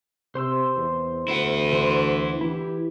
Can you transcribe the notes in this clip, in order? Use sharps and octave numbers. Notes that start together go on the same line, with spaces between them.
C3 C5 C6 E6
E2
D2 E4 F#5
E3 D4 C5
E3 E4 G4